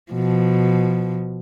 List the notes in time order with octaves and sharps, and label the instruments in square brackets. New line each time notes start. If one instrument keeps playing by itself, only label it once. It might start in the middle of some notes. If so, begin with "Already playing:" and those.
[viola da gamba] B2 F3